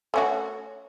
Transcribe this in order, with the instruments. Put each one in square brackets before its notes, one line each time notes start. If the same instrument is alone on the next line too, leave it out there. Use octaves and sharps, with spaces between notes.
[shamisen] A3 C#4 F#4